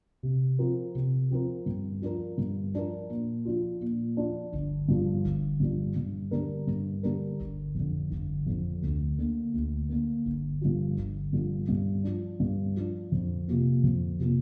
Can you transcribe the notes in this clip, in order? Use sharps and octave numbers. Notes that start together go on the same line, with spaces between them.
C3
F3 C4 F4 A#4
C3
F3 C4 F4 A#4
G2
F3 D4 F4 A#4
G2
F3 D4 F4 A#4
A#2
F3 D4 F4
A#2
F3 D4 F4
G1
G2 F3 D4
G1
G2 F3 D4
G2
D3 G3 D4 A#4
G2
D3 G3 D4 A#4
G1
F2 D3
G1
F2 D3
D2
D3 A#3
D2
D3 A#3
G1
G2 D3 F3
G1
G2 D3 F3
G2
F3 D4
G2
F3 D4
F2
C3 F3 A#3
F2
C3 F3 A#3